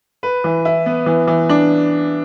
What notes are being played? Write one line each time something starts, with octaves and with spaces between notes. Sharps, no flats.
B4
E3
E4
B3
E3
E3
D4